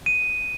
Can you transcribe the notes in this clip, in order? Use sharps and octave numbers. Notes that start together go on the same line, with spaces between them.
D#7